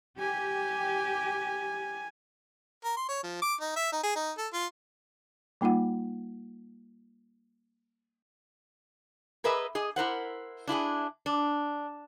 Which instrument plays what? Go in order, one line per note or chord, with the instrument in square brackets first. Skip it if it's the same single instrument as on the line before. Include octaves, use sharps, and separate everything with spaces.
[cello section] G4 [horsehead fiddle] G#5
[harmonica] A#4
C6
C#5
F3
D6
D#4
E5
D#4
G#4
D#4
A4
F4
[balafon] G3 A#3 D#4 F4 F#5
[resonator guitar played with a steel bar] G#4 A#4 B4 D#5 E5
G#4 D#5
E4 A#4 C5 F#5
D4 E4 F4 G#4
D4